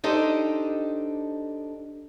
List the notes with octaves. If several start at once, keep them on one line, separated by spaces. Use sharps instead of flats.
D4 D#4 G4 A4 C5 D#5